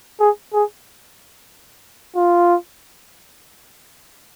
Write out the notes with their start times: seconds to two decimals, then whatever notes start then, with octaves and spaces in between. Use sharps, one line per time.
0.20 G#4
0.54 G#4
2.16 F4